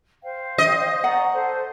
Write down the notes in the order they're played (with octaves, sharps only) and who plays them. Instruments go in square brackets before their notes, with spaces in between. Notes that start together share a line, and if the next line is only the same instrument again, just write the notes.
[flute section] C5 F5 G5
[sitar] D#5
[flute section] D5 A#5 C#6 [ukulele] F#5
[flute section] A4 C5